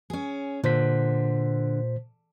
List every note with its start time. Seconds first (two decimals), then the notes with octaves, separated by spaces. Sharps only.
0.10 C#4 G#4
0.64 A#2 D3 C5 B6